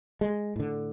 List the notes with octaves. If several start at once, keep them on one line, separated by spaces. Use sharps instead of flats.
G#3
A2 D3